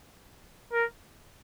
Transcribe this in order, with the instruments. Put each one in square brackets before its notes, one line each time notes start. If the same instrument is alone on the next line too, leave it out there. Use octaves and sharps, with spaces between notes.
[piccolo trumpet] A#4